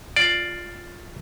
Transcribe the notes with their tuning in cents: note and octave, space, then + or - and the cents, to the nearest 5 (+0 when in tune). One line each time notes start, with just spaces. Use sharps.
F4 +0 D5 +5